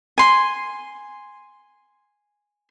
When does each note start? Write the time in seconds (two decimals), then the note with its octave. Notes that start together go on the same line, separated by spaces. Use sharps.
0.18 G#5 C6